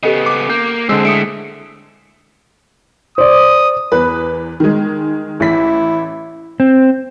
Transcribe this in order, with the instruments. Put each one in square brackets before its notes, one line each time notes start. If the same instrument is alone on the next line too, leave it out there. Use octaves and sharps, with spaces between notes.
[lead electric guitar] C#3 B3 [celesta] G4 A4 D#5
[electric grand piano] D6
[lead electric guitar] A#3 [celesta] G6
[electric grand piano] D3 G#3 [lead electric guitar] C4 D4 [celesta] D#5 E6
[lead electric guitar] A3 E4 [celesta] D#6 C#7 D7
[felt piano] C5 D5 [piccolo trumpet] D#6
[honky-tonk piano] E2 B4
D#3 G#3
[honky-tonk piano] A1 B6 [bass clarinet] E4
[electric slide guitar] C4